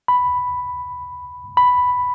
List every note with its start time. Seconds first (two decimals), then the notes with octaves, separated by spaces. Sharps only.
0.08 B5
1.57 B5